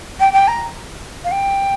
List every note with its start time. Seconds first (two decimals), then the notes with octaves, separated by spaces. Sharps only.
0.20 G5
0.33 G5
0.48 A#5
1.24 F5
1.32 G5